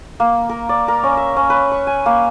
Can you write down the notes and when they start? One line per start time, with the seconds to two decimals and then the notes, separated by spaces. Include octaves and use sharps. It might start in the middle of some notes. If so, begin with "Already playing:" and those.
0.20 A#3
0.49 A#4
0.69 D5
0.88 A#4
1.03 C#4
1.17 E5
1.36 C#4
1.50 B4
1.71 C#6
1.87 G#5
2.06 A#3